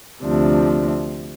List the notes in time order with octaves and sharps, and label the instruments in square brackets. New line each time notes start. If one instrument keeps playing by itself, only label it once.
[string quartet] D2 C3 F3 D4